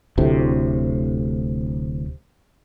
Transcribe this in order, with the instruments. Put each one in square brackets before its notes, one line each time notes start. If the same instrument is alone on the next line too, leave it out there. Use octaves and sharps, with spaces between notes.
[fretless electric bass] D1 D2 A2 C3